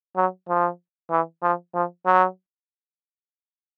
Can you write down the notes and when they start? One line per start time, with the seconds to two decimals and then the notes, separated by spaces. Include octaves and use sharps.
0.17 F#3
0.49 F3
1.11 E3
1.43 F3
1.74 F3
2.06 F#3